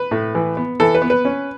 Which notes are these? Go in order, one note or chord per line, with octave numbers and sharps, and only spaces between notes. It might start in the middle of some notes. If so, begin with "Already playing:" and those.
Already playing: B4
A2
E3
B3
E3 A4
B4
B3
B4
C#4